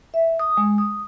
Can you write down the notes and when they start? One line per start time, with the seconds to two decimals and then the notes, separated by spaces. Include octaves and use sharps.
0.14 E5
0.40 D#6
0.57 G#3
0.78 D#6